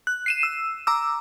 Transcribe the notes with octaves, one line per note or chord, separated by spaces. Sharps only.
F#6
C7 D#7 E7
E6
A#5 D6 E6